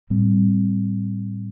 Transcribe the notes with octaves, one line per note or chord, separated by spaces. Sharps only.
A2 G3 C4